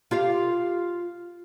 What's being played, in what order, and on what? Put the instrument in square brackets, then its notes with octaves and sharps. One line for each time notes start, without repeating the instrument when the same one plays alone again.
[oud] F4 G4 F5